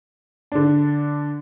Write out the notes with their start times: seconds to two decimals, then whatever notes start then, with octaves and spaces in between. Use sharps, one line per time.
0.52 D3 D4